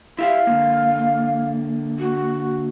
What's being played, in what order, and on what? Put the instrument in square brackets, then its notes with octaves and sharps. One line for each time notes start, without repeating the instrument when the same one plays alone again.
[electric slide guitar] E4 G4 E5 [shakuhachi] F5
[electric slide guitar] D3 A#3
[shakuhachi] F#4